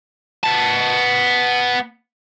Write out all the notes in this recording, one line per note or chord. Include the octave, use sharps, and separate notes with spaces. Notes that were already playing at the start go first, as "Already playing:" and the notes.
B3 A5